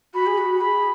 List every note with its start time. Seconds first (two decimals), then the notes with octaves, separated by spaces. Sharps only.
0.14 F#4 B5
0.26 G#4
0.38 F#4
0.60 G#4 B5